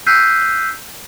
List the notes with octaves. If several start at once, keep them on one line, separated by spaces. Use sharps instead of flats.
E6 F#6 G6 B6 C7 D#7